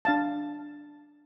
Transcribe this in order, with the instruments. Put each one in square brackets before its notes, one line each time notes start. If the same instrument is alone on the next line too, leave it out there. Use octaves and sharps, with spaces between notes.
[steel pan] D4 F5 A5